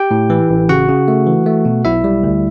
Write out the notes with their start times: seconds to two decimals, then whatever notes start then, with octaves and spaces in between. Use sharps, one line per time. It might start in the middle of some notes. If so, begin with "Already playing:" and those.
Already playing: G4 G5
0.11 A2
0.30 E3
0.50 A1
0.69 C#3 F#4 F#5
0.89 C#3
1.08 A3
1.27 E3
1.46 A3
1.65 B2
1.85 B1 E4 E5
2.04 G3
2.24 D2